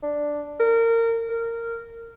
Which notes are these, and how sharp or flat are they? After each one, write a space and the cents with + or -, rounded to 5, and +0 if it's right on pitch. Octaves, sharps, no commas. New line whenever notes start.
D4 +0
A#4 -25
A#4 -15